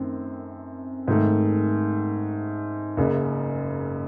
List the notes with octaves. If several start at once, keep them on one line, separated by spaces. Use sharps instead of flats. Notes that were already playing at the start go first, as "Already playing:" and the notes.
Already playing: F#2 D#3 A3 C4
G#2 D#3 A3
F#1 F#2 C#3